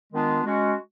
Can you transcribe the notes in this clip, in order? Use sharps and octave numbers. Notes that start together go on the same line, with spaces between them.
D#3 G#3 B3 D4 F4
G#3 C#4 F#4